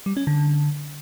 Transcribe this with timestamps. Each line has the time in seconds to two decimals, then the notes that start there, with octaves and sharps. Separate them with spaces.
0.06 G3
0.17 C#4
0.27 D3